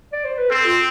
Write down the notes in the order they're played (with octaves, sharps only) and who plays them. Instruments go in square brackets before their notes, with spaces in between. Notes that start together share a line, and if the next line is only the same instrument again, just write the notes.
[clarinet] D5
C5
B4
[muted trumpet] C4 [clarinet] A4
[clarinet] F4